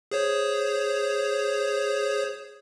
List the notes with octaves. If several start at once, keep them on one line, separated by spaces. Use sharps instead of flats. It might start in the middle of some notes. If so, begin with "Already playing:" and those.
G#4 C5 C#5